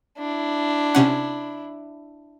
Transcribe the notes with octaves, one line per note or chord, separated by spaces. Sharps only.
D4 E4
C3 C#4 F#5